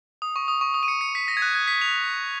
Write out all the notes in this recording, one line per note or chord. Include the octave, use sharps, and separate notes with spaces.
D#6
C#6
D#6
C#6
D#6
D#7
C#7
C#7
B6
A#6
G#6
F#6
G#6
B6
F7